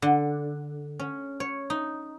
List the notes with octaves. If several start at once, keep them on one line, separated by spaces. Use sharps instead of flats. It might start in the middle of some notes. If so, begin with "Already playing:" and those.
D3
C#4
C#5
D#4